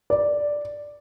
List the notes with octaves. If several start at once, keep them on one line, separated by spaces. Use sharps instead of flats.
D5